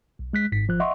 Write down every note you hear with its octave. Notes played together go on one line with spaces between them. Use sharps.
B1
G#3 F#6 B6
G#1 G#2 B6
G#1 F3 F#6
D#5 E5 F#5 C6 C#6